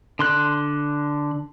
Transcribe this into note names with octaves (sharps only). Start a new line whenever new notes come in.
D3 C6 F#6